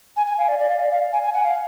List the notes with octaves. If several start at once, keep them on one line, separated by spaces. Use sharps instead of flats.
G#5
G#5
F5
D5
D5
F5
D5
F5
G#5
G#5
F#5
F5